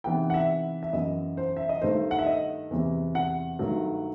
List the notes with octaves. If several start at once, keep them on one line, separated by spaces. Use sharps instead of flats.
C3 E3 B3 D#4 G5
F#5
E5
E5
F#2 E3 B3 D#5
C5
E5
D#5
G2 D#3 A3 C5
F#5
E5
D#5
E2 C3 E3
F#5
G2 D#3 F#3 A3